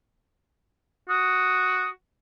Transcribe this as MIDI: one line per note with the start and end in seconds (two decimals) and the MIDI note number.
1.09 1.88 66
1.09 1.90 87